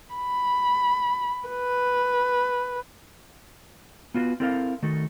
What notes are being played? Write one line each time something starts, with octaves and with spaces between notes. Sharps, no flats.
B5
B4
B3 F4 F#4 A#4 B4
C4 E4 A4 A#4 E5 F5
D#3 A3 F#4 A4